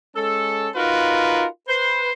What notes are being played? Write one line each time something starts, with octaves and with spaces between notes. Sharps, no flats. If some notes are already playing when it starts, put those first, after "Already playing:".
G#3 C#4 A4
D#4 F4 F#4 A#4 B4
B4 C5